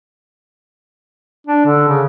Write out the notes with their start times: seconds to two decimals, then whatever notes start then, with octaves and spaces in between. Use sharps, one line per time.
1.47 D4
1.65 D3
1.88 C#3